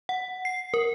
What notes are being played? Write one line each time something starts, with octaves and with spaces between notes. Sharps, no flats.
F#5
C7
A#4